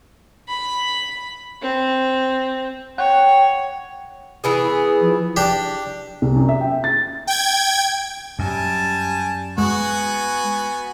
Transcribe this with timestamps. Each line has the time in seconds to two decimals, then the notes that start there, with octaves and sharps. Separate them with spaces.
0.48 B5
1.62 C4
2.98 C#5 F#5 G5
4.44 E3 B3 G#4
5.01 F3
5.37 D4 G4
6.22 C2
6.36 F#2
6.49 E5
6.61 G5
6.84 A6
7.27 G5 G#6
8.39 F#2 G3 G#5 A5
9.58 G#3 B3 F#4 G#5